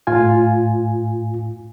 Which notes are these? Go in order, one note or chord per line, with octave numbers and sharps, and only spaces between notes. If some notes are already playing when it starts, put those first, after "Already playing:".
A2 F4 G#5